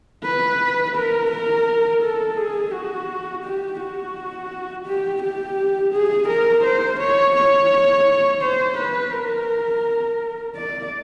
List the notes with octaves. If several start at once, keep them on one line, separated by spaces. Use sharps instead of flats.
B4
A#4
A#4
A4
G#4
F#4
G4
F#4
G4
G4
G#4
A#4
C5
C#5
C#5
C5
B4
A#4
D5